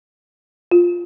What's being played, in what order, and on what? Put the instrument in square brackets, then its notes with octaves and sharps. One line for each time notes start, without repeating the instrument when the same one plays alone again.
[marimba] F4